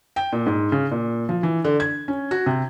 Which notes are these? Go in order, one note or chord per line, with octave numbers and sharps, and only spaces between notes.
G5
A#2
G#2
C#3
A#2
F3
E3
D3
G#6
C#4
F#4
C3